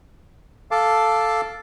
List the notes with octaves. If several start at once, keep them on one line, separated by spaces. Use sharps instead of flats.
A4 F5 A5 D6